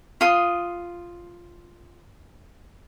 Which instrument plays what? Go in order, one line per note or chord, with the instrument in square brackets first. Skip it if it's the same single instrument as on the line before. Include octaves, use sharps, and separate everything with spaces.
[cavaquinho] F4 C6 D#6